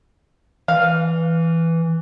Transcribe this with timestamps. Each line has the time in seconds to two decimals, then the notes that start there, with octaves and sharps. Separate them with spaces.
0.68 E3 F5